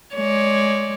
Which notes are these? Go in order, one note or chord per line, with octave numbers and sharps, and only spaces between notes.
G#3 C#5 D5